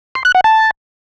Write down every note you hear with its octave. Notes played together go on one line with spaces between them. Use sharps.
C6
F#6
F#5
A5